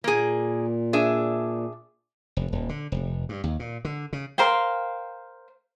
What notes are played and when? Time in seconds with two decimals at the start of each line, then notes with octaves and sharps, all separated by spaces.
0.04 A#2 A#3 G#4
0.93 D4 G#4 E5
2.37 F1
2.52 D#1
2.69 D3
2.92 F1
3.29 G2
3.44 D#2
3.59 A#2
3.85 D3
4.13 C#3
4.38 A#4 C5 F5 G5